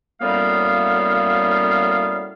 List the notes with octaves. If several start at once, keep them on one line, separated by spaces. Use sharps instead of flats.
F#2 A2 G3 A#3 B3 F5